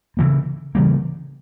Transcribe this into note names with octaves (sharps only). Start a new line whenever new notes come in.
C#3 E3 G3 A#3
C#3 E3 G3 A#3